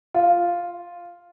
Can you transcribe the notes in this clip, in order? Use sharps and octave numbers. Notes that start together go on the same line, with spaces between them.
F4